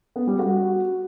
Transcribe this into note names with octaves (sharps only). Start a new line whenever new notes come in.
B3
G3
F#4